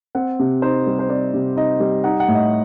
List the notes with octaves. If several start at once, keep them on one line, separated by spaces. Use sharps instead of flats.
C4 F#5
C3
D#4 C5
G3
C5
C4 D5
C3
D#4 D#5
G3
D#4 F#5
F#5
A2
D#5